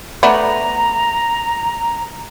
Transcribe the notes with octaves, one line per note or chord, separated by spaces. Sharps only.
A3 B3 D4 A#5